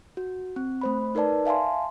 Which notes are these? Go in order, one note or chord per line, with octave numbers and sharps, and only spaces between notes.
F#4
C4
A3 C5 B5
D#4 A#4 B4 D5 A5
E5 F5 G#5 A5 C6